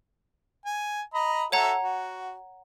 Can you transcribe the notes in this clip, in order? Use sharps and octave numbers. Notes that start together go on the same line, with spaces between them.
G#5
D#5 A#5 B5
F#4 A4 C#5 E5 F#5 A#5
F#4